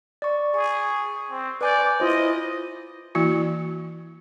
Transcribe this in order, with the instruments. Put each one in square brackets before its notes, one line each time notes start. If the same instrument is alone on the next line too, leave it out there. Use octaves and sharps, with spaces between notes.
[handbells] D5 C#6
[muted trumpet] G#4 [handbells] C#6
[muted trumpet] C4
[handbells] B4 G#5 G6 [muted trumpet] D5
[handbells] E4 F4 C5 [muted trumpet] D#5
[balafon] E3 A#3 E4 F#4